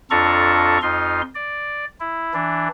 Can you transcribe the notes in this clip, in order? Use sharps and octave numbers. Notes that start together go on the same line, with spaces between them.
F2 D4 F4 A4 A#5 C#6
F2 D#4 F4 C6
D5
E4
E3 D4